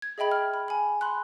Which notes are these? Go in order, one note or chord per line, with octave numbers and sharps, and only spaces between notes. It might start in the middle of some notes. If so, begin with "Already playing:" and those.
G#6
G#4 D#5 E5 G5 B5 G#6
F6
B5
G#5 B5
B5 C6 F#6